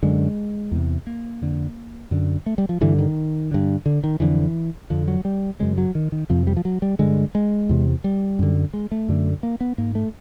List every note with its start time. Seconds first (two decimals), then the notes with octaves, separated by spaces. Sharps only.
0.03 F#2 D3 G#3
0.71 E2 C3
1.07 A#3
1.42 F2 D3
2.11 F#2 D3
2.46 A3
2.58 G3
2.69 F3
2.81 G2 D3 E3
2.99 D#3
3.51 G2 D3
3.86 D3
4.04 D#3
4.20 F2 D3 E3
4.90 F2 D3 F3
5.08 F#3
5.25 G3
5.60 F#2 C#3 G#3
5.78 F#3
5.95 D#3
6.12 D#3
6.29 F2 C3 F3
6.47 G3
6.57 F3
6.65 F#3
6.82 G3
6.99 G2 D3 G#3
7.35 G#3
7.69 E2 C3
8.04 G3
8.39 F#2 D3
8.73 G#3
8.92 A3
9.09 F#2 D3
9.43 A#3
9.61 B3
9.78 G#2 A#3
9.95 A3